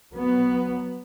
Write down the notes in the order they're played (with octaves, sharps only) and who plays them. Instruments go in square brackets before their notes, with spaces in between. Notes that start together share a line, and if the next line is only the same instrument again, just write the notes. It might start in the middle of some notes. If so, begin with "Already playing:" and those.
[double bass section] F#3 B3